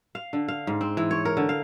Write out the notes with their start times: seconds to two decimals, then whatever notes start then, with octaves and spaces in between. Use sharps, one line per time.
0.15 F5
0.33 D3
0.48 F5
0.67 G#2
0.81 C4
0.97 E3
1.11 C#5
1.25 A#4
1.37 D3
1.49 F5